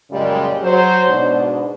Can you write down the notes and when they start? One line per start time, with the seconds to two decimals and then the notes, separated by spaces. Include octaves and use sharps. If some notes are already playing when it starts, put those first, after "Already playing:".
0.10 F#2 A#2 C#3 G3 G#3
0.62 F#3 C5
1.08 G#2 B2 D4